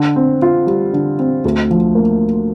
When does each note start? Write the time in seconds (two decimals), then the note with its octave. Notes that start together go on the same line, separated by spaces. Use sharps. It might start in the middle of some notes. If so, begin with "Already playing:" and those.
Already playing: D3
0.16 C4
0.42 F4
0.67 G3
0.93 D3
1.19 C4
1.45 D2
1.71 F3
1.95 A#3